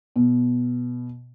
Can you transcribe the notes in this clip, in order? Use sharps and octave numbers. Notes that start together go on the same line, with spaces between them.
B2